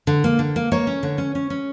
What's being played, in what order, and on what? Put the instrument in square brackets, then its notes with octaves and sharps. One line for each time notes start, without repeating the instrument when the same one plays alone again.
[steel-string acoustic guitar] D3
A#3
D3
A#3
A#3 C#5
C#4
D3
C#4
C#4
C#4